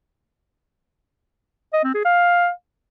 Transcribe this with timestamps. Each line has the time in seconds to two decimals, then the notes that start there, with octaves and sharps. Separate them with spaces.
1.73 D#5
1.84 C4
1.94 G#4
2.05 F5